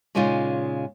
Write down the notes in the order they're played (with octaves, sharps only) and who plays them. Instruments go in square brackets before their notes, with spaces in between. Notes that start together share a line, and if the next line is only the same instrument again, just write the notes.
[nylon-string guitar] A#2 C#3 G#3 C#4 D#4 F4